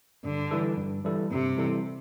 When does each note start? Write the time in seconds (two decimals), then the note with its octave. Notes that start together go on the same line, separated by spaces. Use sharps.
0.24 G2 D3
0.51 E3 G3 E4 A4
0.77 G2
1.04 E3 G3 E4 A4
1.31 G2 C3
1.57 E3 G3 E4 A4